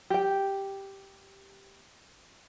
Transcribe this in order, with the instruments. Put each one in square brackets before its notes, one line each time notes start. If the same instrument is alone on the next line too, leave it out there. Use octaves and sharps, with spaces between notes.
[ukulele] G4 G5